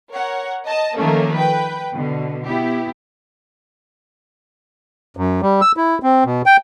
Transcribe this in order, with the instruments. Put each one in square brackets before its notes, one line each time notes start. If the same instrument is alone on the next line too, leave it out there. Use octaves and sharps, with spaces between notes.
[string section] A#4 C#5 F#5
D#5 A5
D#3 F3 A3 A#3 C#4
B4 G5
B2 D3
B3 E4 G4
[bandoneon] F#2
G3
E6
E4
C4
B2
G5